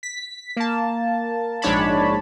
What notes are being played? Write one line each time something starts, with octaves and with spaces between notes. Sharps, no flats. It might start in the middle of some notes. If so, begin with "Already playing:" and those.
B6
A#3 A5
A#1 G#2 D4 C#5 A5 B5